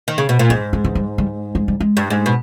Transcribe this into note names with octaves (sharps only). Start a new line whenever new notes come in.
D#3
C#3
B2
A#2
G#2 E3
G#3
E3
G3
G3
G#3
G3
G#3
G2
G#2
B2